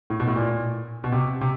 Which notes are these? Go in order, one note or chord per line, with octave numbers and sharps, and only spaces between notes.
A2
B2
A2
A#2
B2
C3
C3